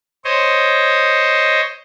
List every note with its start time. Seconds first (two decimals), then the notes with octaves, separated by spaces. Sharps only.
0.25 C5 C#5 D#5